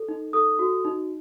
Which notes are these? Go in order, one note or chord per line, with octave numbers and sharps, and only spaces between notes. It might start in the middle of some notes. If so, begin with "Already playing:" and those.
Already playing: A4
D#4
A4 D#6
F#4
D#4